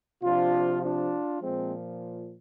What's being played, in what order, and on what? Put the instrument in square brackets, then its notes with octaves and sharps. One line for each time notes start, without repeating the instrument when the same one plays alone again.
[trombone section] C3 F3 D4 F4
D4 F4
A#2 F3 G#3 C4